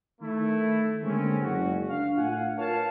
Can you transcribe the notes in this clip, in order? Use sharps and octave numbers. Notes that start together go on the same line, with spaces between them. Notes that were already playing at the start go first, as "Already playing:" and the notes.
D#3 A3 E4
D3 G#3 A#3 C4 C#4
F#1 F#4
D4 F5
A2 F4 F5 F#5 G#5
F4 A#4 B4 C#5 F5 A5